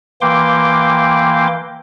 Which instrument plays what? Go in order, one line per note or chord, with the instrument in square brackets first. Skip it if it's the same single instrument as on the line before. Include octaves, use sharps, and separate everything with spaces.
[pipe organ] E3 A#3 G5 C6 D6